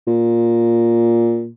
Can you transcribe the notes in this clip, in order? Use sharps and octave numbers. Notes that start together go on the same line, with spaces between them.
A#2